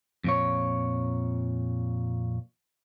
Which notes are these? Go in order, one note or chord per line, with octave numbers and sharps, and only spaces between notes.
F2 A#2 C#5